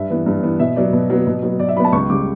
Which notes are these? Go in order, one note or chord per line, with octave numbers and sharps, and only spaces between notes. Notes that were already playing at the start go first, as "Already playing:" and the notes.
Already playing: G2 E5
E3 B3
G2
E3 B3
B2 E5
F#3 B3 D5
B2
F#3 B3
B2
F#3 B3
B2 D5
E5
F#3 B3 A5 B5
C#2 C#6
C#3 G3 D6